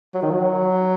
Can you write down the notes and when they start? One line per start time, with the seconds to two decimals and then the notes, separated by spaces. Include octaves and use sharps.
0.14 F#3
0.22 D#3
0.31 F#3